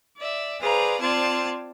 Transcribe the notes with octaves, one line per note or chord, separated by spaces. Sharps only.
D5 E5
G#4 B4 C5 D5 F5 A#5
C4 F4 C5 D5 A5 G#6